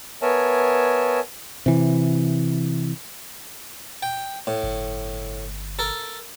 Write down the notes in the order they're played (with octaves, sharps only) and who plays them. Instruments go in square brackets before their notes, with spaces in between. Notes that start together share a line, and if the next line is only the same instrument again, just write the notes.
[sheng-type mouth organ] B3 A#4 C#5 E5 G#5 A5
[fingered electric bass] C3 E3
[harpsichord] G5
A2
[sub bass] G1
[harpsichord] A4 A#4